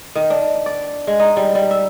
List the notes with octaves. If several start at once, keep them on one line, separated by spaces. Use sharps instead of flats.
D#3
D4
D5
G#3
D#4
G3
G3
E5